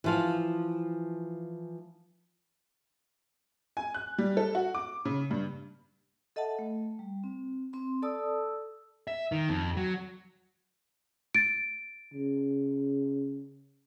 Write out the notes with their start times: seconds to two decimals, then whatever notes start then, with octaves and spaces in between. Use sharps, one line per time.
0.04 E3 F3 F5
3.77 G#5
3.94 F#6
4.18 G3
4.37 A4
4.55 F#4
4.74 D6
5.05 C#3
5.31 G2
6.36 A4 D#5 E5 F#5 A5
6.59 A3
6.99 G3
7.24 C4
7.73 C4 C6
8.02 A4 D5 A5 D#6 E6
9.07 E5
9.32 D#3
9.49 F2
9.77 F#3
11.35 A6 D7
12.13 C#3